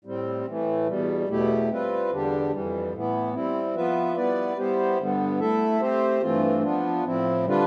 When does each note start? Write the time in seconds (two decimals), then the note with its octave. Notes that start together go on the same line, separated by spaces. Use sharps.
0.05 A2 G3 C4
0.46 A2 E3 A3
0.87 E2 B2 G3
1.28 E2 B2 A3 E4 G4
1.70 G3 C4 F4 B4
2.11 E2 D3 G3 D4 G4
2.52 F2 E3 G3
2.93 A2 E3 B3 E4
3.34 G3 C4 E4
3.75 F3 B3 F4 B4 E5
4.16 G3 B3 E4 B4 D5
4.57 G3 B3 E4 G4 C5
4.98 G2 D3 G3 B3
5.40 A3 E4 A4 E5
5.81 A3 C4 G4 C5
6.22 G2 E3 A3 C4 F4
6.63 F3 B3 D4 F4
7.04 A2 F3 C4 E4
7.45 D3 G3 D4 F4 B4